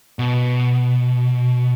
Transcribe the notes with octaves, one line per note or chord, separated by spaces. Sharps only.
B2